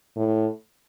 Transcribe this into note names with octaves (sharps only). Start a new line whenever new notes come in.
A2